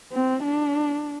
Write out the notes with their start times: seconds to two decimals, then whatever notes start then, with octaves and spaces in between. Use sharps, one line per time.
0.12 C4
0.43 D4